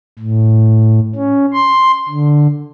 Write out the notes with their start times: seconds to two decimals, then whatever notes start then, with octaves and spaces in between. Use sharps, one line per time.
0.19 A2
1.15 C#4
1.53 C6
2.10 D3